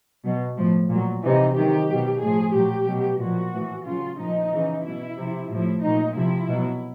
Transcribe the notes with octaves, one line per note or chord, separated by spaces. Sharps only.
B2 F#3
A2 F3
A#2
F#3
C3 E3 D#4
C3 D#3 F#3 G4
B2 F#3
A2 F3 G#4
A#2 F#3 G4
B2 F#3
A#2 F3 F#4
A2 E3
C#3 F#3 F4
A#2 F3 D#4
C#3 E3
B2 F#3 E4
C3 F3
A2 F3 E4
A#2 F#3 D#4
C3 F3 E4
B2 F#3